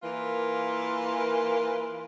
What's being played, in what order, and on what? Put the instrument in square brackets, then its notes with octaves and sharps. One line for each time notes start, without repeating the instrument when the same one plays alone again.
[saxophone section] E3 A#3 F4 A#4 B4